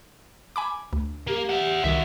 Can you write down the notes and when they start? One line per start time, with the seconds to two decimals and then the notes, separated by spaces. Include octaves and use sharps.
0.56 G#5 B5 D6
0.93 D2
1.27 A#3 G4
1.49 E5 F#5
1.84 C2 D#3 F#4 E5